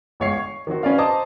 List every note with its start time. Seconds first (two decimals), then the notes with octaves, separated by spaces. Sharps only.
0.20 G1 G#3 C#5 F5 C7
0.33 C#6
0.67 D#3 F#3 C4 F#4
0.83 C#4 B4 D5 F5
0.98 C5 D#5 A5 A#5 D6 D#6